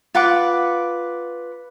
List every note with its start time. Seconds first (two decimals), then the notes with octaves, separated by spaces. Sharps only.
0.15 F4 B4 F#5 D6